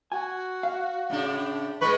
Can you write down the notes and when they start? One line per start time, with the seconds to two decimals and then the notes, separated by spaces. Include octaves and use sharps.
0.12 F#4 G#5
0.63 F5
1.10 A2 C#3 D4
1.81 A2 G#3 B4 C#6